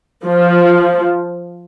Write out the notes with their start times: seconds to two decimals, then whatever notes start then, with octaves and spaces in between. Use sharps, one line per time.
0.24 F3